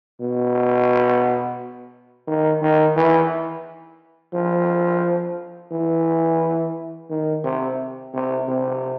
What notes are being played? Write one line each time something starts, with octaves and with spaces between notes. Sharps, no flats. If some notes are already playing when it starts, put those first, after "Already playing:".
B2
D#3
D#3
E3
F3
E3
D#3
C3
C3
C3